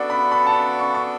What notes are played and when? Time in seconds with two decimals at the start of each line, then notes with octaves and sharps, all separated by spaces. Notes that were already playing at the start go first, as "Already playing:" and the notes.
Already playing: B3 D4 F#4 A4 D5
0.10 B5
0.32 B5
0.47 A5
0.79 C#6
0.95 C#6